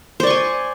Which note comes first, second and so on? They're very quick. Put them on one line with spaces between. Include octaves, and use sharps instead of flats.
C5 D5 C#6 G#5